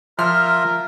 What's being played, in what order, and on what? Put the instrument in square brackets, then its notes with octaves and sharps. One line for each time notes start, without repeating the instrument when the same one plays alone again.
[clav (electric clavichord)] F3 [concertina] F4 E5 [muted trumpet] A#4 [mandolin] F6